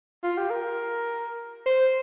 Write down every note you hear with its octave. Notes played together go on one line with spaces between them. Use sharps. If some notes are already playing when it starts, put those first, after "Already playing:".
F4
G4
A#4
C5